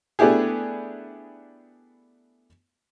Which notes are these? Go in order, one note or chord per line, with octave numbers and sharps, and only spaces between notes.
A3 B3 D4 E4 G4 G#4